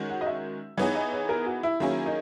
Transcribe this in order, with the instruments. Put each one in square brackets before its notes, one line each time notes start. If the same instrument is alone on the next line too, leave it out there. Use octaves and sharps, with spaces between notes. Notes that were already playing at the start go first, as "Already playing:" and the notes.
Already playing: [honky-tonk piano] D#3 G#3 C#4 F#4
[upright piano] F#5
D#5
E5
[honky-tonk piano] E3 B3 D#4 G#4 [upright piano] C#5
[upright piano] D#5
C#5
A#4
F#4
E4
[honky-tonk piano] D#3 F#3 A#3 C#4 G#4 [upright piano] E4
[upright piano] D#4